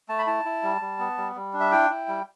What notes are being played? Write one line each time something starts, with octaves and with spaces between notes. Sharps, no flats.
A3 A5
B5
E4 A5
E4
G3
G3
B3
G3
G3
D4
E5
E4 G5
E4
G3